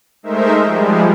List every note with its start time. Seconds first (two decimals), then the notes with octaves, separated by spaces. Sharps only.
0.23 G#3 A3 D#4 A#4 C5 E5
0.65 F3 G3 G#3